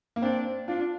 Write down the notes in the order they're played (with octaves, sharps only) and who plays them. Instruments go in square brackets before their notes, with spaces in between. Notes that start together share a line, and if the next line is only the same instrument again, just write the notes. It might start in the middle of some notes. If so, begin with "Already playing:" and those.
[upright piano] A#3
[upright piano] C4 [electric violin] D4
[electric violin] D4 [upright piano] F4